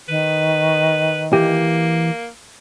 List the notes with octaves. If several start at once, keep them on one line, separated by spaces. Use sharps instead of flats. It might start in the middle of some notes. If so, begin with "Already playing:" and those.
D#3 B4
E3 A#3 G4